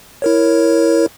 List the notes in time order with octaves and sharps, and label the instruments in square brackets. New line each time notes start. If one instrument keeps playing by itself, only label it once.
[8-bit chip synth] E4 A#4 C#5